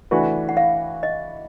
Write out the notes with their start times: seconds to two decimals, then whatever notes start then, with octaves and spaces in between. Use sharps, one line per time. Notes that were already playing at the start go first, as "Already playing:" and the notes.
0.11 E3 A3 D4 F#4 B4
0.49 F#5
0.57 F5
1.03 D#5